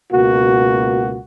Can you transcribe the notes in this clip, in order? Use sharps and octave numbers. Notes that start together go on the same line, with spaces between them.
C#2 B2 A#3 F#4